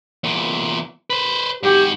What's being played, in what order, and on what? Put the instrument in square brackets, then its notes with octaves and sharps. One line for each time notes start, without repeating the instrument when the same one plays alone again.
[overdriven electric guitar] E2 A#2
B4 C5
[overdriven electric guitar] G#2 F#4 [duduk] G4